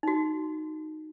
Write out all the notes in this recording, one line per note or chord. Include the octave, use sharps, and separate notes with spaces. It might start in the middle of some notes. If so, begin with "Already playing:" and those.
D#4 F#4